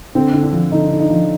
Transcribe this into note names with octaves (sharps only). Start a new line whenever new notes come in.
D3 C4
D3
D4
F3
D3 D#4
D3
D#4
F3